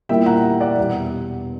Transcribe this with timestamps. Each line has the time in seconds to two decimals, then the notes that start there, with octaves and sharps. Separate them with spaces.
0.09 A#2 G3 A#3 E4 E5 G5
0.26 F#5 A#5
0.61 D5 F#5
0.77 E2 B2 G3